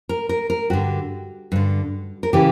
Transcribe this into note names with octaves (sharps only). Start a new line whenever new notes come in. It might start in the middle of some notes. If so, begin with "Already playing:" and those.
A#4
A#4
A#4
G2 D3 F#4
G2 D3
A#4
C#3 E3 G4